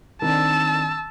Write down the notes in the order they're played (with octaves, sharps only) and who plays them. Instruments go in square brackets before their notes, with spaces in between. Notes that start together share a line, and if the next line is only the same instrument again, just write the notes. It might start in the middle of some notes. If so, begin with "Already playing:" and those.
[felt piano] D#3 C4 D4 [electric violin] A5 E6